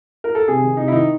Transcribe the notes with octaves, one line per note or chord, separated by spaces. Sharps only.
A#4
A4
C3 G#4
D#3
C3 D#4
E4
D#3 D#4